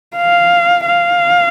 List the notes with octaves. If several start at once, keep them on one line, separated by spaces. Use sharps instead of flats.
F5
F5